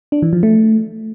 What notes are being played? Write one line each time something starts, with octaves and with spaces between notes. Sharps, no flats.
D4
E3
F3
A3